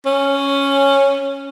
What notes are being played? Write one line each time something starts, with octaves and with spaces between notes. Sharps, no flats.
C#4